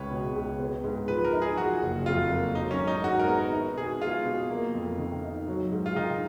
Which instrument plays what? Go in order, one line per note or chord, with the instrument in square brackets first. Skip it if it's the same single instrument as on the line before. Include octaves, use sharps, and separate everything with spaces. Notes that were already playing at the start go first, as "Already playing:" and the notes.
Already playing: [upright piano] C#2 G#3 [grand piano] B4 C#5
[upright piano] B2
C#2
B3
G#2
[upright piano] F3 [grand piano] B4
[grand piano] A#4
[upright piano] D#4
[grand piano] G#4
[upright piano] F3 [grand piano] F#4
[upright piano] F#1
[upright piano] F2 [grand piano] F4
[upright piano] A#3
[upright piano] F#3 [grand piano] D#4
[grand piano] C#4
[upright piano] G#1
[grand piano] D#4
[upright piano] G#2 [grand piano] F#4
[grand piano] A#4
[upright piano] B3
D#4
[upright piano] B2 [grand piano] G#4
[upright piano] G#3 [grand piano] F4
[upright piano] B2
A#3
F2
D#3
D#4
F#3
G#2
[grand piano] F4
[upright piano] D#3 [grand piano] D#4